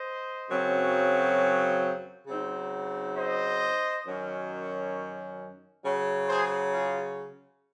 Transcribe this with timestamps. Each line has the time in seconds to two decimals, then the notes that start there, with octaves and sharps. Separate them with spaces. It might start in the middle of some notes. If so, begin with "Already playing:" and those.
Already playing: C5 D#5
0.49 F#2 C#3 F#3 C4
2.27 C#3 F#3 C4 D#4
3.17 C5 D#5
4.06 F#2 D#3 F#3 C#4
5.84 C#3 F#3 C#4
6.29 G#4 C5
6.73 F4 G#4